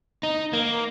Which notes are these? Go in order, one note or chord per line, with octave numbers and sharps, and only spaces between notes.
D#4
A#3